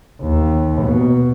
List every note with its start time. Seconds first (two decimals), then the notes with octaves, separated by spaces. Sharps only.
0.22 D#2
0.82 B2